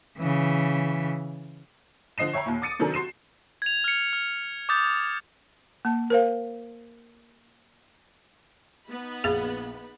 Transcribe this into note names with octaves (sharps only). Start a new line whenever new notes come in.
C#3 E3
D3 F3 D#5 C7 E7
C#5 E5 G5 A#5 B5
D#2 A#2
D6 D#6 A6 C#7 D#7
C3 D#3 F#3 D4 A4 A#4
F#4 C6 C7 E7
G#6 F7
F6 C#7
F6
D6 D#6 G6 A6
A#3 A5
A#4 C5 F5
B3 D#4 B5
A#1 G#4 F5 A6